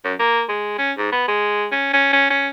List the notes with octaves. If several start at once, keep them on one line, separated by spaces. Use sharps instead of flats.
F#2
A#3
G#3
C#4
G#2
B3
G#3
C#4
C#4
C#4
C#4